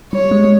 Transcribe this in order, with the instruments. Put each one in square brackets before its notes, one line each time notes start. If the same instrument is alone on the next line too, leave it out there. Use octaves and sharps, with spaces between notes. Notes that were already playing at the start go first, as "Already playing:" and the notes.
[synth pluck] G3 [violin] C#5
[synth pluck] G#3
G#3